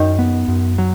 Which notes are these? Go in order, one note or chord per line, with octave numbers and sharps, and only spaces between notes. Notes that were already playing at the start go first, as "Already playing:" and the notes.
Already playing: F#2 D#3
B3
F#2
F#3